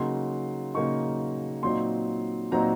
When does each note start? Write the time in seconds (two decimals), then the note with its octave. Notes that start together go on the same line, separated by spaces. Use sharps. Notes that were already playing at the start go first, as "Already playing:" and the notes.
Already playing: C#3 F#3 A#3 D#4 C6
0.74 C#3 F#3 A#3 D#4 C#6
1.63 A#2 F#3 C4 D#4 C6
2.52 A#2 F#3 C4 D#4 A#5